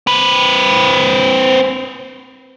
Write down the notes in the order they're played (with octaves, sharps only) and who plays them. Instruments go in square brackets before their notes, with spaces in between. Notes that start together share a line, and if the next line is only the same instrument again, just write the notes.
[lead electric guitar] C4 B4